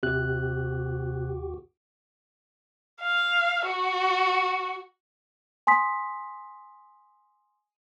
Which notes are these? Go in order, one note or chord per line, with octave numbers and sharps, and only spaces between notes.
D#2 C3 F#4 G4 F#6
F5
F#4
G#5 C6 D#6 B6